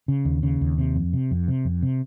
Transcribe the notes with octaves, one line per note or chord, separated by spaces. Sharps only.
C#3
D#2
C#3
D#2
C3
F2
C3
F2
C3
F2
C3